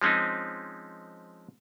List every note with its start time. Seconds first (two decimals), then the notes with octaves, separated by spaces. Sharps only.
0.01 F3 G#3 C4 C#4 D#4